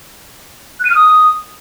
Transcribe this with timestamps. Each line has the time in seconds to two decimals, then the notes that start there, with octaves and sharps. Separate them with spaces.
0.80 F#6
0.85 D#7
0.90 F6
0.95 D#6